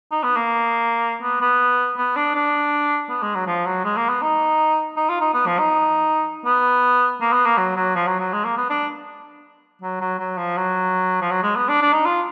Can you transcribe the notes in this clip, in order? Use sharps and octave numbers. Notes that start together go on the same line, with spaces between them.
D#4
B3
A#3
B3
B3
B3
D4
D4
B3
G#3
F#3
F3
F#3
G#3
A#3
B3
D#4
D#4
F4
D#4
B3
F3
D#4
B3
A#3
B3
A#3
F#3
F#3
F3
F#3
F#3
G#3
A#3
B3
D4
F#3
F#3
F#3
F3
F#3
F3
F#3
G#3
B3
D4
D4
D#4
F4